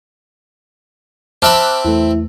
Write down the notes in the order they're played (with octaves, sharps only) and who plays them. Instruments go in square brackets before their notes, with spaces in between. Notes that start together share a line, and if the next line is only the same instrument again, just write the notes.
[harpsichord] C4 E5 B5 [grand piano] A5 [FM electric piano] D6 F6 F#6
[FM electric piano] E2 A3 [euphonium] E4